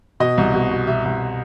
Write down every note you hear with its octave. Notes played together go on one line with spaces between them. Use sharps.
B2 D#5
C2
B2
B2
B2 E5
C2